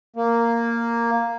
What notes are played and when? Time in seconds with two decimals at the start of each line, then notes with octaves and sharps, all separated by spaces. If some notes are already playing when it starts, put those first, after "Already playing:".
0.16 A#3